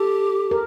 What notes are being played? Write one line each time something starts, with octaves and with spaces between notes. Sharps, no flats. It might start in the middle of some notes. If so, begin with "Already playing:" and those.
Already playing: G4 A4
A#4